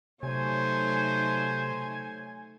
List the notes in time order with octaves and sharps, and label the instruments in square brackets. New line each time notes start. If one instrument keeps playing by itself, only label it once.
[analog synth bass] C3 [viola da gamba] F#3 A3 D#4 [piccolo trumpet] C5 [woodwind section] C#5 G#5